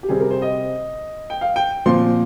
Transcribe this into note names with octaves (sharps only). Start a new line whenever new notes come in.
G4
C3 G3 C4 G#4
A#4
C5
D#5
G5
F5
G5
A#2 F3 C4 C6